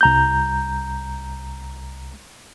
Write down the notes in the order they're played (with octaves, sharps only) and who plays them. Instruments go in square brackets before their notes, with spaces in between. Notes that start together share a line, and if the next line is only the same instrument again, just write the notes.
[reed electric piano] C2 A#5 G6